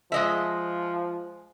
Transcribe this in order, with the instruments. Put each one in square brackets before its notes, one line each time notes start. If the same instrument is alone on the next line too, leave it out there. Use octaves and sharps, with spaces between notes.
[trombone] F3 [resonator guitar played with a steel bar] G#3 D#5 E5